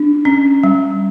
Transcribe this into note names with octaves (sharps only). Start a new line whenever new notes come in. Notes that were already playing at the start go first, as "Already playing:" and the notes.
Already playing: D4
C#4
G3